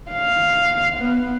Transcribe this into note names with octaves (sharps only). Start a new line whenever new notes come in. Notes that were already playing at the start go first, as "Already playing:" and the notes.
F5
B3